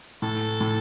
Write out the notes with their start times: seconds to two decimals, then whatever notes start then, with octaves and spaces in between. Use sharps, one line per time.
0.22 A2 A4
0.61 A2